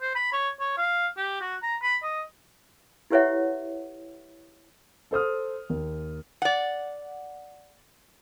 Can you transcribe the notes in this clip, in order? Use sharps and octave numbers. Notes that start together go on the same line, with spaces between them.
C5
B5
C#5
C#5
F5
G4
F#4
A#5
B5
D#5
E4 G4 B4 C#5 E5 F#5
A4 C5 D#6 F6
D#2
D5 F#5